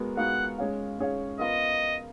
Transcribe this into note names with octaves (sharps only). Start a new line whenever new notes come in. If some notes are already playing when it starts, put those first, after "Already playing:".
Already playing: G#3 B3 F#4 A#4
G#3 B3 F#4 A#4 F5 F#5
G#3 C#4 G#4 C#5 F5
G#3 C#4 G#4 C#5 F5
B3 F4 A#4 D#5